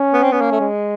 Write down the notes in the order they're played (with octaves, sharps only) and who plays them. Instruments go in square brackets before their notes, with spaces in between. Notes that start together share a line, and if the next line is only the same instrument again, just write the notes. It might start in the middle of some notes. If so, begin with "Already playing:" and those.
Already playing: [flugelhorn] C#4
[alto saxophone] B3
C4
[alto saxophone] B3 [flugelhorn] C#4
[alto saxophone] A#3
A3
G#3